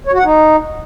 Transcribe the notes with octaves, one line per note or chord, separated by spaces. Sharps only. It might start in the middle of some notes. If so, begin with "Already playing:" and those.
C#5
F#4
F#5
D#4